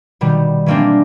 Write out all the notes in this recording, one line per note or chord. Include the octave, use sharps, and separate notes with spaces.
B2 D#3 G3
E3 G#3 A#3 C4 D4